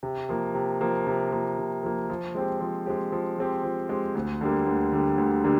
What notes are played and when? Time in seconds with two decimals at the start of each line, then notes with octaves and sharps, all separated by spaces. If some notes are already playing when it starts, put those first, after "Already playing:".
0.03 C3
0.29 F3 A#3
0.55 C3
0.81 F3 A#3
1.07 C3
1.32 F3 A#3
1.58 C3
1.84 F3 A#3
2.10 F3
2.35 G#3 C4 G4
2.61 F3
2.86 G#3 C4 G4
3.12 F3
3.38 G#3 C4 G4
3.64 F3
3.89 G#3 C4 G4
4.15 D2
4.41 D3 G3 A#3
4.67 D2
4.92 D3 G3 A#3
5.18 D2
5.44 D3 G3 A#3